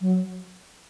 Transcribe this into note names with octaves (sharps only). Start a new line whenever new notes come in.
F#3